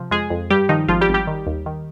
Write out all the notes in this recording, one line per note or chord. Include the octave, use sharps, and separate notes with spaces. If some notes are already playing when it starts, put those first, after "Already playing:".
Already playing: C3 F3
F2 G#3 G#4
F2
G2 G3 G4
D#3 F3 D#4
G#1 F3 F4
G3 G4
G#1
G3 G4
D#3
D#2
D#3